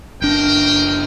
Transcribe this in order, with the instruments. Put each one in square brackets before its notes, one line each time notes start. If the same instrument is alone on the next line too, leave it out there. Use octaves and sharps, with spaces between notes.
[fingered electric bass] F#1 D4 [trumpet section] A#4 G5